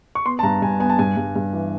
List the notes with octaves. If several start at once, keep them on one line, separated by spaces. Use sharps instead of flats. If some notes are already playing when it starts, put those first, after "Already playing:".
C#6
B3 C6
A5
G2 A#5
G2 G#5
B3 G#5
A5
G2 G#5
G2
G2
E3